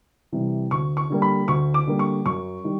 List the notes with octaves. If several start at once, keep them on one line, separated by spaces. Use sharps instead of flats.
C3 E3 G3
D2 C#6
C#6
D3 G3 A#3
B5
D2 C#6
D6
D3 G3 A#3
C#6
F#2 C#6
D#3 G3